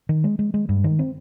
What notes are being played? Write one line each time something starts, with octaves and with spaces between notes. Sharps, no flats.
D#3
G#3
G#3
G#3
G2
D#3
C4